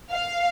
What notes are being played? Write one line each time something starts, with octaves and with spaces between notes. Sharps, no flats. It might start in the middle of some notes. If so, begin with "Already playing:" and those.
F5